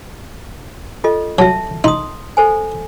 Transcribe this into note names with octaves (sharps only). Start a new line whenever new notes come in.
F4 A4 D#5
F#3 E5 A5
D#4 C6 D#6
A4 C5 G#5